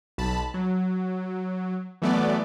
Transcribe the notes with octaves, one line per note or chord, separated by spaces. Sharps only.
B1 A5 B5
F#3
E3 F#3 A3 B3 D5